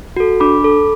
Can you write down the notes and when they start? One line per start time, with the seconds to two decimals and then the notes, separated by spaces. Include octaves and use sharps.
0.16 F#4 A4
0.40 D4 B5 D6
0.64 A4